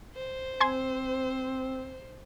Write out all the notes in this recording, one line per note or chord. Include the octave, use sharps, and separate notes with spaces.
C5
C4 G#5 C6 G#6